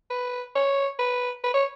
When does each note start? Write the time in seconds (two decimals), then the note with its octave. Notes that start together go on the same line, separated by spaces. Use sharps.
0.10 B4
0.55 C#5
0.99 B4
1.44 B4
1.54 C#5